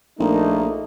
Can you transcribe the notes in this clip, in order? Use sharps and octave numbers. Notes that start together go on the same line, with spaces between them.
A#1 A3 A#3 D#4